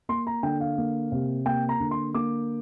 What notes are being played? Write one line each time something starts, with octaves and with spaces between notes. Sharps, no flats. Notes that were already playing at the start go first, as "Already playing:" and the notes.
A#3 C6
A#5
D3 G5
F5
A#3
C3
A#3 G5
A#5
D3
C6
A#3 D6